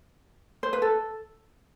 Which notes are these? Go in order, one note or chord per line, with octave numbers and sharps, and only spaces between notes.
C5
B4
A4